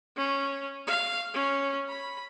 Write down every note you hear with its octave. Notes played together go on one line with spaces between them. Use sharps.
C#4
F5
C#4
B5